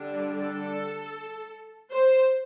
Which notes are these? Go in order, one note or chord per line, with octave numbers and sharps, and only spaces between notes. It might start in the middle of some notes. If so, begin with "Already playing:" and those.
Already playing: D3 G3 D4
A4
C5